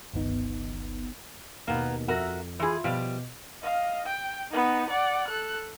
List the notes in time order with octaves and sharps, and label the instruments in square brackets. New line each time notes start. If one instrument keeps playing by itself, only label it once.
[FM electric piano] G1 C#2 D#3 B3 D#4
[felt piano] D#2 B2 [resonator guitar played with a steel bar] A#3 B3
[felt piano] F2 [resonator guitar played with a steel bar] F#4 A#4 E5
[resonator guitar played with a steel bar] E3 G#4 [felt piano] F4 C6
[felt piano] B2 [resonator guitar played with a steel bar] F3 G3
[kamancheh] D#5 F5
G5
B3 D#4
D5 F#5
A4 F#6